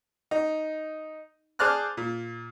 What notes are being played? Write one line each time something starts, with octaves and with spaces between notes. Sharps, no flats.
D#4
G#4 C5 D5 A5 F6 F#6
A#2